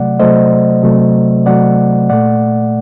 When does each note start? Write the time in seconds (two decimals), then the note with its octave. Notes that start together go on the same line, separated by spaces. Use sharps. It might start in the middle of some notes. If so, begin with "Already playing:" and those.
Already playing: C3 F#3 A3 D5 F#5
0.19 C3 F#3 A3 C5 D#5
0.83 C3 F#3 A3
1.46 C3 F#3 A3 D5 F#5
2.09 A#2 A3 D5 F#5